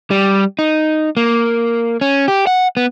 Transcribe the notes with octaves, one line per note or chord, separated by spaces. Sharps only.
G3
D#4
A#3
C#4
G4
F#5
B3